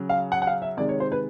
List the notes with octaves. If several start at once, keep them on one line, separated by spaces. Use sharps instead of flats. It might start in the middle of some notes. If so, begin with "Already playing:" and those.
Already playing: C#3 F#3
F5
F#5
F#5
F5
E5
C3 D#3 G#3 D5
C#5
C5
B4